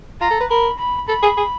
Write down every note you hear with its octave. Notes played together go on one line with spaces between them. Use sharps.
F4 A#5
A4
B4
A#4 B5
B5
A4 B5
G#4
G#4